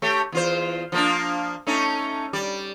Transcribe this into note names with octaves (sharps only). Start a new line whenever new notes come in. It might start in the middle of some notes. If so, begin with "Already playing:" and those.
A3 G4 C#5
E2 F4 C5
F3 A#3 D4
A3 C#4 D#4
G3 D5